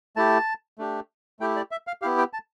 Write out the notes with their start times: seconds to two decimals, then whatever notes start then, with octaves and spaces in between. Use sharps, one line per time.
0.16 A3 E4 G4 A5
0.79 A3 D4 G4
1.40 A3 E4 G4 G5
1.56 D5
1.71 E5
1.87 F5
2.02 B3 E4 G4 F5
2.18 G5
2.33 A5